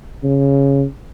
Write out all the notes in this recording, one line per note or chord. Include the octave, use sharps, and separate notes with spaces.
C#3